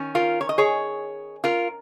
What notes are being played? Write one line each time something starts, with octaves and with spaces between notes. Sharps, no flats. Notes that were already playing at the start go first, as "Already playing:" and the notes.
Already playing: D#3 C#4
F4 A#4
C#5
D#5
G#4 C#5
F4 A#4